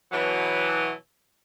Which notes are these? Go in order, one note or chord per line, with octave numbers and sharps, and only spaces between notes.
B2 E3 F#3